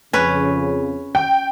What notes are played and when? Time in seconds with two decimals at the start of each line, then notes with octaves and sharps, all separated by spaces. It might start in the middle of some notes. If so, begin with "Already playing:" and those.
0.13 F2 C#3 C#4 B4
1.15 G5